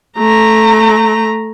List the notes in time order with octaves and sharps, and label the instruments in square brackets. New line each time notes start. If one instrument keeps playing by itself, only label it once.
[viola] A3 A#5